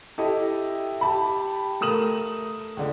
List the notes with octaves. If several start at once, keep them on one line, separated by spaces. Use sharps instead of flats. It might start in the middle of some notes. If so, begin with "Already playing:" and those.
E4 G4 A4 D#5
G4 A5 B5
A3 A#4 D#6 E7 F#7
C#2 D3